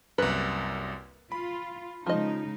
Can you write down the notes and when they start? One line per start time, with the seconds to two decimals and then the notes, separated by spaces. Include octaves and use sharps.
0.18 C2 F#2 A#3 B4
1.32 F4 B5
2.06 C#3 F3 G#3 D#4 D#5